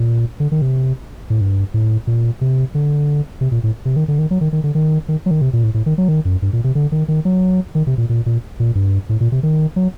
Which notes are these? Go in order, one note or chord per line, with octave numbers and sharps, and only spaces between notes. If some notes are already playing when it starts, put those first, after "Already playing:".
Already playing: A#2
D3
D#3
C3
A2
G2
A2
A#2
C3
D3
C3
A#2
A2
C3
D#3
D3
D#3
F#3
D#3
D#3
D3
D#3
D#3
F#3
D#3
C3
A#2
A2
A2
D#3
F#3
D#3
F#2
G2
A#2
C3
D3
D#3
D#3
F#3
D#3
C3
A#2
A#2
A#2
A#2
G2
A2
A#2
C3
D#3
F#3